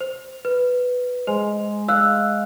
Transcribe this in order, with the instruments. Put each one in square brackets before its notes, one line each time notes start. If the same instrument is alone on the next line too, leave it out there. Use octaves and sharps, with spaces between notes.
[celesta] C5
B4
[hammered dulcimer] G#3 [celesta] C5
[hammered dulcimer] F5 [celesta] E6 F#6